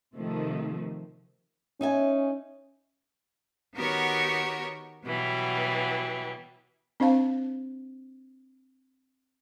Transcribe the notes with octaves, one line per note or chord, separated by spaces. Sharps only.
C3 D#3 F3 A3
C#4 D#4 E5 G#5
D#3 B3 F#4 G4 A#4 C#5
B2 E3 F#3 G3
C4 D4 C5 F5 A5